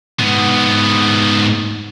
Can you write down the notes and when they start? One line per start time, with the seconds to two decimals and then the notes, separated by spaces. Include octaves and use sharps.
0.19 G#2 B3